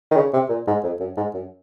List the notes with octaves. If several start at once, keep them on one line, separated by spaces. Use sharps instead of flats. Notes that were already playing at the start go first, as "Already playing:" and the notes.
D#3
C#3
C3
A#2
G#2
F2
F#2
G#2
F#2